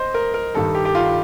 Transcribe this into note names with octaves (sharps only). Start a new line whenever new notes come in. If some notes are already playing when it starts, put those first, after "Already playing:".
Already playing: C5 D#5
A#4
A#4
G2 D#3 G3 A4
G4
G4
F4